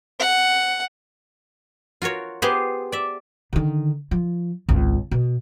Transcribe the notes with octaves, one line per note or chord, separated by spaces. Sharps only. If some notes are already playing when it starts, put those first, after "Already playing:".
F#5
F4 F#4 A#4 C#5
B3 G4 G#4 C5
D5 E5
D3 D#3
F3
G#1 C#2
B2